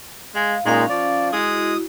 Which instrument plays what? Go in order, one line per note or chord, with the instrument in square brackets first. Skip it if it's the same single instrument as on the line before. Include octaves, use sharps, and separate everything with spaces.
[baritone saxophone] G#3 [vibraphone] F5
[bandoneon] A#2 D#4 [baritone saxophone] G#3 [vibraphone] C#4 F5
[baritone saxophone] F3 [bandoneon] D5
[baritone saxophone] G#3 [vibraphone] E4 F#4 [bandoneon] D#6